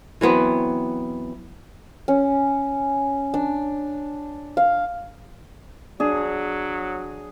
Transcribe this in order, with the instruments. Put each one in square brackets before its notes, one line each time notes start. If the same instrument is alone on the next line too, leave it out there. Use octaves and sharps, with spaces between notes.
[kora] E3 F#3 B3 C4
[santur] C#4
D4
F5
[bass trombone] F#3 [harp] D4 [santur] G#4